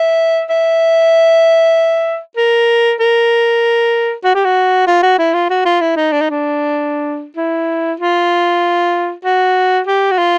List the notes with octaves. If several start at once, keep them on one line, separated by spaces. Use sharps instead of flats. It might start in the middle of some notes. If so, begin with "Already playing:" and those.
Already playing: E5
E5
A#4
A#4
F#4
G4
F#4
F4
F#4
E4
F4
F#4
F4
E4
D#4
D4
D#4
D4
E4
F4
F#4
G4
F#4
F4